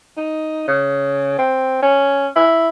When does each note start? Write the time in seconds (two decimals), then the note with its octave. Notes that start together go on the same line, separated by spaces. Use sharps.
0.17 D#4
0.68 C#3
1.39 C4
1.82 C#4
2.36 E4